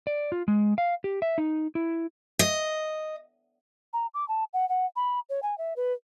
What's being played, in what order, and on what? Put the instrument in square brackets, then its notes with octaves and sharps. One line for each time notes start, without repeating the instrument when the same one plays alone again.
[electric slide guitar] D5
F4
G#3
F5
G4
E5
D#4
E4
[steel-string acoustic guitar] D#5
[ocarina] A#5
D6
A5
F#5
F#5
B5
C#5
G#5
E5
B4